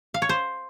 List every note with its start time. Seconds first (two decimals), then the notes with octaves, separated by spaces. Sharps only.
0.14 F5
0.22 C#5
0.29 C5